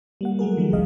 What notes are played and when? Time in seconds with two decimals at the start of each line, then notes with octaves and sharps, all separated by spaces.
0.21 G3 A#3 F#5
0.39 F#3 A3 G#4 A#4
0.57 D#3 F3 G3 G#3
0.72 G#1 C#2 C3 D#5 F5